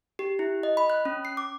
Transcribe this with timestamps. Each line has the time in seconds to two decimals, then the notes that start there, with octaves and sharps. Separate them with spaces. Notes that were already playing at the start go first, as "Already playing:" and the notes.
0.19 G4
0.39 E4
0.63 D#5
0.77 B5
0.90 F#6
1.05 C#4
1.25 C7
1.37 D6